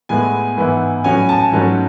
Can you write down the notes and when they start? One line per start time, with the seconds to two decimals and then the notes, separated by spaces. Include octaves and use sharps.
0.09 A2 G#3 B3 E4 G#5
0.57 G#2 E3 B3 E4
1.04 A2 F#3 C#4 G#5
1.29 A5
1.52 G#2 F#3 A3 C#4